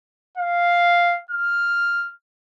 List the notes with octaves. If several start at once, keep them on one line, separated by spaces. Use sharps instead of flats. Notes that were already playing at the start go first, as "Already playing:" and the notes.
F5
F6